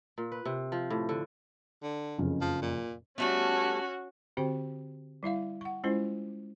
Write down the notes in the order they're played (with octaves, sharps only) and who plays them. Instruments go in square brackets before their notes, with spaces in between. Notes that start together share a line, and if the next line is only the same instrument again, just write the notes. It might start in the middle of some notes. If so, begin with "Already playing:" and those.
[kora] A#2
B4
C3
F3
A2
D3
[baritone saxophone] D3
[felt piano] F#1 F2 C#3
[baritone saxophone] F3
A#2
[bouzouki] G3 A3 B3 [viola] C#4 F#4
[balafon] D3 C4 F#4 G4 C5 G5
G3 E4 E5 F5
F#5 C#6
G#3 C#4 E4 F4 C5